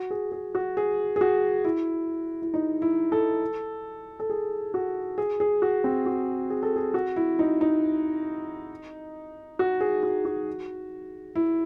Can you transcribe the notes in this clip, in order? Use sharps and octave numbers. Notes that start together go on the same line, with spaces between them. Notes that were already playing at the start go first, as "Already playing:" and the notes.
Already playing: F#4
G#4
G#4
F#4
G#4
G#4
F#4
E4
E4
D#4
E4
A4
A4
G#4
F#4
G#4
G#4
F#4
C4
F#4
G#4
A4
G#4
F#4
E4
D#4
D#4
F#4
G#4
F#4
F#4
E4